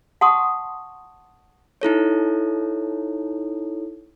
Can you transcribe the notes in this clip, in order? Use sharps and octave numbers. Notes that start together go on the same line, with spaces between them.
F#5 A5 C6 C#6 D#6
D#4 E4 A4 C#5